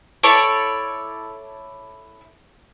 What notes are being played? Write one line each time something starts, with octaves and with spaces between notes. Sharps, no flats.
E4 A4 C#5 D5